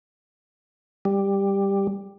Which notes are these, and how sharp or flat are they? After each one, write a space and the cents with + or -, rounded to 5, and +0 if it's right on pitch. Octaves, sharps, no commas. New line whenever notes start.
G3 +10